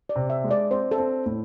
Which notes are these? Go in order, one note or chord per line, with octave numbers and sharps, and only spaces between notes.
D5
C3
E5
G#3
D5
C4 C5
A4
C4
A2